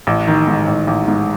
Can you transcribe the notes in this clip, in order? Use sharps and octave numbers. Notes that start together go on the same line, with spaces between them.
A1
D#3
G#2
A1
A1
G#2